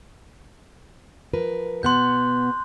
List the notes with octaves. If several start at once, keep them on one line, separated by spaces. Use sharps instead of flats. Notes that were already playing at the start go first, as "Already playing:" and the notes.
F3 A#4 B4
B2 B3 F#5 C6 F#6 G6